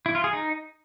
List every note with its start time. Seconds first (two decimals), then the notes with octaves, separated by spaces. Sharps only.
0.06 E4
0.15 F4
0.24 G#4
0.33 D#4